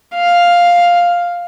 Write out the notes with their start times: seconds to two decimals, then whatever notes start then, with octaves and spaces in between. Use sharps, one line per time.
0.15 F5